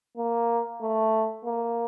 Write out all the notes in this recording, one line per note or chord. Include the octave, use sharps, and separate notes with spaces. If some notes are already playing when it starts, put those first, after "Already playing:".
A#3
A3
A#3